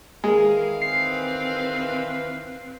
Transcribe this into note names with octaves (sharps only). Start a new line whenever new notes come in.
D#3 E3 G#3 G#4 A#4 F5
C4 B4 C7